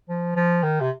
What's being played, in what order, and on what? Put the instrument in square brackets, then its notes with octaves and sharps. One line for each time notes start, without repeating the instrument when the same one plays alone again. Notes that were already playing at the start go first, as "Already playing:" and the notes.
[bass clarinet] F3
F3
D#3
C3